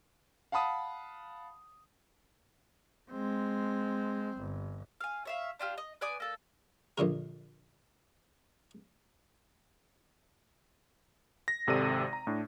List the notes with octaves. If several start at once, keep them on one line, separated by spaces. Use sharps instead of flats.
F5 F#5 A5 B5 D#6
G#3 C4
G1
F5 G#5
C#5 E5 F5
D4 F4 G4 F6
D#5
B4 D5 G#5 D#6
A#3 A4
A#1 A#2 D3 A#4
A#6
G#1 C3 A4 D5 D#7
A#5
A2 D4